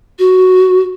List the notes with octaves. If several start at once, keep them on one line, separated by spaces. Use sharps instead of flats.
F#4